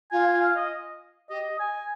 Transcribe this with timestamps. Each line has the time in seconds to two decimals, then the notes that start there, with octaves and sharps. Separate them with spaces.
0.11 F4 G#5
0.26 G#5
0.41 F5
0.56 D#5
1.30 G4 D#5
1.60 G#5